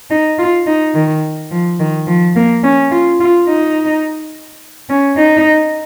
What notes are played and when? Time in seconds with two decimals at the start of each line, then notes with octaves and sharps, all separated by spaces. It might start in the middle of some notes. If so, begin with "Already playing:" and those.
0.10 D#4
0.38 F4
0.67 D#4
0.94 D#3
1.51 F3
1.79 D#3
2.07 F3
2.36 A#3
2.63 C#4
2.91 F4
3.20 F4
3.48 D#4
4.89 C#4
5.17 D#4